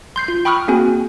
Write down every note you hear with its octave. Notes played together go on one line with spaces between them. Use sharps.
C6 G6 C7
F4
G5 B5 C#6 D#6 F6 F#6
A#3 C4 F#4 G#4 G#5